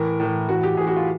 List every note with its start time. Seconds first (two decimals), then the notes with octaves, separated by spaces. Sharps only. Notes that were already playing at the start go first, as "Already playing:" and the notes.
Already playing: A2 E3 A#4
0.20 A2 E3
0.49 A2 E3 F#4
0.63 G4
0.77 A2 E3 G#4
0.87 F#4
0.96 F4